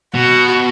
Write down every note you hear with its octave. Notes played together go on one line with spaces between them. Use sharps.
B2 F#4